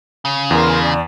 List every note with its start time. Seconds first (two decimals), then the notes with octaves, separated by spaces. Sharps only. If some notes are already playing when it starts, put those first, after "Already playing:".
0.25 C#3
0.51 E2 A#4 C6
0.83 D5